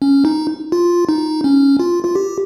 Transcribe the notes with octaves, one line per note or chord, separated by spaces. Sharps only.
C#4
D#4
F4
D#4
C#4
F4
F4
G4